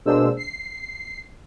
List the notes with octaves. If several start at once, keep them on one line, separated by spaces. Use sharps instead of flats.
B2 G#3 A#3 D4 C5 E6
C7